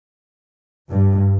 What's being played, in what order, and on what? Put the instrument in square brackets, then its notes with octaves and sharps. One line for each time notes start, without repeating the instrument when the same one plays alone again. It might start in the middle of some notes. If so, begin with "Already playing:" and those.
[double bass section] G2